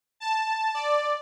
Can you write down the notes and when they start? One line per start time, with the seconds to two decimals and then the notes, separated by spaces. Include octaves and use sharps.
0.20 A5
0.74 D5